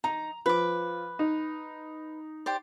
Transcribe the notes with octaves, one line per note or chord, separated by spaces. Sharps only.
D#4 A#5
F3 B4 D6
D#4
G4 C5 D5